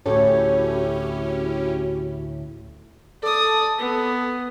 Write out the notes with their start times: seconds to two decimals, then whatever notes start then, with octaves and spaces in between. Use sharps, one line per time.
0.06 D2 A2 C#4 E4 F#4 G4 A4 C#5
3.23 A4 D5 D#6
3.78 B3